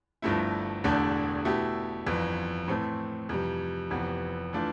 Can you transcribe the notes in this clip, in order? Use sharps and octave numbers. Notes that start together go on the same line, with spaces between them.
G1 G2 F3 A3 E4
E1 E2 D3 A3 D4
B2 A3 E4 G4
G1 F2 E3
A2 E3 A3 C4
F2 C3 E3 G3
F1 F2 C3 E3 B3
E3 A3 D4 F4